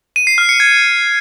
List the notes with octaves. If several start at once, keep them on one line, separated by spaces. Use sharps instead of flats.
D#7
C7
F6
C#7
G#6